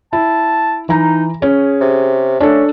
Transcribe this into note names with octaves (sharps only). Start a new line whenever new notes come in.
E4 A5
E3 D#4 A#5
C#4 G#4
C3
A3 C#4 D4 A4